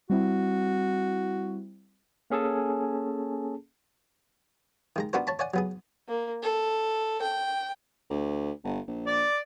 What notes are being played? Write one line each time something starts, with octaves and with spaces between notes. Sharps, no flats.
G3 C4 E4 F#4
A#3 C#4 G#4 A4 A5
D#3 G#3 A#5
B3 D4 F#4 A#4 C5
C#5 A5 B5
C#5 D5 F#5 G#5
F#3 B3 G#4
A#3
A4
G5
D2
G1
A#1
D5